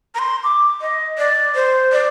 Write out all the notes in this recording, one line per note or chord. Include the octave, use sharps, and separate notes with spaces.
A#5
C6
D6
D#5
D5
C5
D5